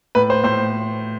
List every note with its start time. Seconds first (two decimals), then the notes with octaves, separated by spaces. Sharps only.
0.15 A2 B4
0.30 C5
0.44 A2 C5